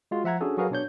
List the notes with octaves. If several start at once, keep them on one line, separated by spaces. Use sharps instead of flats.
G#3 F4 F#4
F3 E5 F#5 A#5 G#6
C#4 D4 F#4 G#4 A4
F#3 F#4 G#4 A#4 B4 F5
B2 D4 C#5 G6